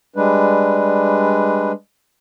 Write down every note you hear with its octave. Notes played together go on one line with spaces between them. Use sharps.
G3 G#3 D4 B4